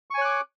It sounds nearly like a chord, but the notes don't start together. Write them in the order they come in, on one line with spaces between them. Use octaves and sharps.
C#6 G#5 C#5 F#6 D6